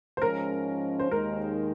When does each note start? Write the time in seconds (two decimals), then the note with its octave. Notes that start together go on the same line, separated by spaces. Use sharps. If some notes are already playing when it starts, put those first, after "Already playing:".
0.17 C5
0.22 G#2 F3 G#3 C#4 A#4
0.99 C5
1.11 D#2 D#3 G#3 A#4